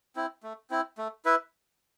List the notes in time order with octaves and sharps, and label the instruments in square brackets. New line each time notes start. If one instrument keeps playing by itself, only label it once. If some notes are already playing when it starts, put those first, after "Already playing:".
[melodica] C4 E4
A3
C4 E4
A3
E4 B4 E5